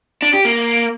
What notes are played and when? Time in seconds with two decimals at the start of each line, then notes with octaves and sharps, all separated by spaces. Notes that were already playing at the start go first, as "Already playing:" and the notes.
0.22 D4
0.34 G4
0.45 A#3